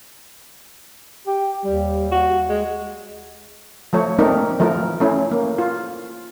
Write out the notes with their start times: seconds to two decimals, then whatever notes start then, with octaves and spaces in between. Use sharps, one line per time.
1.27 G4
1.65 D#2 G3
2.11 F#4
2.49 G#3
3.93 F3 A3 C#5
4.19 A3 A#3 C4 D4 D#4 A#4
4.60 E3 F3 A3 A#4
5.00 A3 C#4 E4
5.31 A#3
5.58 F4